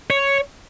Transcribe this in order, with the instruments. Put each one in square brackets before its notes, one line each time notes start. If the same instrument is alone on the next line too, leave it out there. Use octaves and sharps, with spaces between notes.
[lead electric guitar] C#5